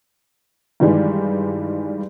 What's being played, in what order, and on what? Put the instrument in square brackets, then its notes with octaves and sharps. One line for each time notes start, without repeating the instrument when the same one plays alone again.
[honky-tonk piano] G2 D#3 E3 G3 G#3